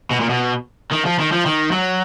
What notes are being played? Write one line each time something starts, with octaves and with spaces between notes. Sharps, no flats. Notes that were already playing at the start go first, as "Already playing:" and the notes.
B2
A#2
B2
D#3
F3
D#3
F3
D#3
F#3